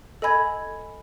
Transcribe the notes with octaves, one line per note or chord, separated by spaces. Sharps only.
A4 D#5 G#5 B5 G#6